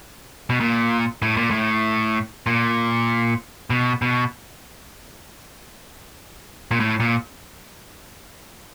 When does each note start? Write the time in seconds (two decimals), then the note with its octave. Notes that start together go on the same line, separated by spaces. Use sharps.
0.50 B2
0.61 A#2
1.22 A2
1.37 A#2
1.51 A2
2.46 A#2
3.70 B2
4.02 B2
6.71 A#2
6.80 A2
7.00 A#2